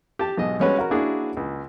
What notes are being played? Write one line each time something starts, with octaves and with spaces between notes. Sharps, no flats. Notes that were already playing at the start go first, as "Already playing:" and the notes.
G4 A5
B1 G#2 D#5
G3 G#3 C#4 F#4 B4 C#5
F#4 A#4
A#3 D4 E4 F#4 G#4
C#2